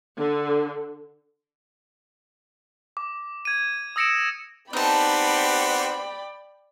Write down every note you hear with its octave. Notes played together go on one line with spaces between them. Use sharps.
D3
D6
G#6 D#7
D#6 E6 A#6 C#7 D7 E7
B3 C4 D#4 G4 D5 G5 A5 B5